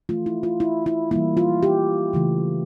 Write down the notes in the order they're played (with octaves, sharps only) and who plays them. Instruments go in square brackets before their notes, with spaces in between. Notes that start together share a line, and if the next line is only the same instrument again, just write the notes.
[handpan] E3 A3 F4
E4
F4
E4
E4
E3 G3 A#3 E4
F4
G4
C#3 E3 A3